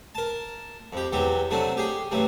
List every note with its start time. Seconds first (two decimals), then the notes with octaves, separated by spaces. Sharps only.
0.15 A#4 A5
0.93 F2 G4
1.13 E2 E3 F#3 G4
1.50 C3 F#3 A3 C#4 D4
1.77 G4 G#4
2.11 A1 E3 F#3 G3